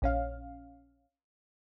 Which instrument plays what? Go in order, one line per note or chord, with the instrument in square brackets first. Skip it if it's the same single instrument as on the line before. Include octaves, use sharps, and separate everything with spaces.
[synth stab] A#1 C#4 F5